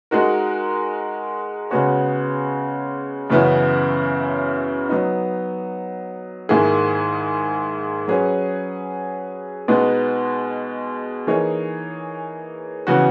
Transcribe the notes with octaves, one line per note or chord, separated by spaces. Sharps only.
G#3 D#4 F#4 A#4
C#3 G#3 B3 F#4 C#5
F#2 C#3 E3 B3 E4
F#3 B3 D#4
G#2 D#3 A#3 E4 G#4
F#3 C#4 G#4 B4
B2 G#3 B3 D#4
E3 A#3 D#4 G#4 C#5
C#3 E3 B3 F#4